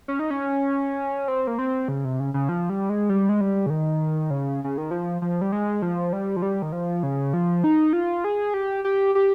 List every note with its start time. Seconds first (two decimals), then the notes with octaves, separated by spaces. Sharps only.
0.08 C#4
0.19 D#4
0.30 C#4
1.28 C4
1.47 A#3
1.59 C4
1.88 C#3
2.05 C3
2.20 C#3
2.34 C#3
2.49 F3
2.70 G3
2.89 G#3
3.09 G3
3.29 G#3
3.41 G3
3.66 C#3
3.70 D#3
4.30 C#3
4.64 C#3
4.78 D#3
4.91 F3
5.22 F3
5.41 G3
5.52 G#3
5.82 F3
6.13 G3
6.36 F3
6.42 G3
6.62 D#3
6.72 F3
7.03 C#3
7.33 F3
7.64 D#4
7.93 F4
8.24 G#4
8.54 G4
8.85 G4
9.15 G4